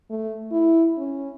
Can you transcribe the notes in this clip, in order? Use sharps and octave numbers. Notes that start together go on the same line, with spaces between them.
A3
E4
C#4